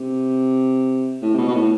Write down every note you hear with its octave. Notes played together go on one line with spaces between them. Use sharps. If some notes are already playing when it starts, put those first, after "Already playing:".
Already playing: C3
A2
C3
B2
B2
A2